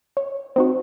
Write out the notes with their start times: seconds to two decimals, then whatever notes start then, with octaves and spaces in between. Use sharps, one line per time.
0.17 C#5
0.56 C4 D#4 F#4